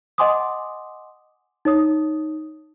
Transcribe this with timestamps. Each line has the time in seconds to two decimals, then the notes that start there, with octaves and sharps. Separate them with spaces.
0.18 D#5 F#5 G#5 C6 D6 D#6
1.65 D#4 C#5 D#6